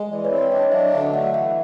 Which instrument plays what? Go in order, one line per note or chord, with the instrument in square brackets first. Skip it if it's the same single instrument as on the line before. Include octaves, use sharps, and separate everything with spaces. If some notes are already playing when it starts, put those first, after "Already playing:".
Already playing: [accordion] G#3
[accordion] E3 [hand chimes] D5
[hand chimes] B4 C#5
[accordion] C4
[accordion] D4 [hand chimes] C#5 D#5
[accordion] F#3 [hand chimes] D5 E5
[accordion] D3 [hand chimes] D#5 F5
[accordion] A3 [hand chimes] E5 F#5
[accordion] E3 [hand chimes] E5 F#5